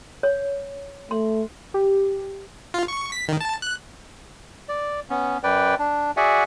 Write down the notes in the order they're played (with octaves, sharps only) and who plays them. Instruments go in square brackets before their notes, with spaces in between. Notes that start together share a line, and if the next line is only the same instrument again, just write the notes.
[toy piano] C#5
[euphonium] A3 [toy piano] C6
[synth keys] G4
[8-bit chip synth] F4
C#6
B6
D#3
A5
F#6
[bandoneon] D5
B3 C#4
F#2 B4 D5 G5
D4
F#4 G#4 D5 E5 F#5 G#5